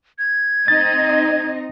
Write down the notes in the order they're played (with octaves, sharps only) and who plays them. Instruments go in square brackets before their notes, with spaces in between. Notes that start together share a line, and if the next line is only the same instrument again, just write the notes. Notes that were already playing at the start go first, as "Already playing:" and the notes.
[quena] G#6
[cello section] C4 D#4 D#5 [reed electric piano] A6